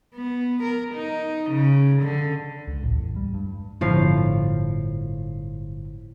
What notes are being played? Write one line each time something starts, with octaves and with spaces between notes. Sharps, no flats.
B3
A#4
D#4
C#3
D3
C#2
A1
E2
G3
G2
G1 A2 F3 F5